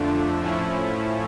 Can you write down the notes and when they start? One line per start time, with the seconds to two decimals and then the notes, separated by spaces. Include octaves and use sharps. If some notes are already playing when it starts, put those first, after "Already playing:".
Already playing: F2 D3 F3 A3 D4
0.42 A2 F3 A3 C#4 E4